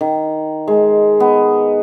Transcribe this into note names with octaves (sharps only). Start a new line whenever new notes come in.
D#3
G#3
B3